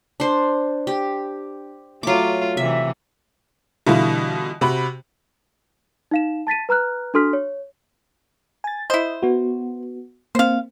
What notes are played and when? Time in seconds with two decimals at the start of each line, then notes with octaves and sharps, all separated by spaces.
0.20 D4 C5
0.87 G4
2.03 F#3 A3 F4 D6
2.57 C3 E3 E5
3.87 B2 D3 E3 G3 E4 F4
4.61 C3 F#4 B5
6.11 D#4 F5 E7
6.47 A5 A6 B6 D#7
6.69 B4 A#5 F6 F#6
7.14 D4 F#4 A4 C6 F6 B6
7.33 C#5
8.64 G#5 A6
8.90 E4 C5 D#5
9.22 B3 F#4
10.35 A#3 C4 C5 F5